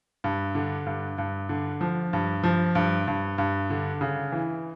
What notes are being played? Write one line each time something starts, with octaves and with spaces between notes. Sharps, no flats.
G2
D3
G2
G2
D3
F3
G2
F3
G2
G2
G2
D3
C#3
E3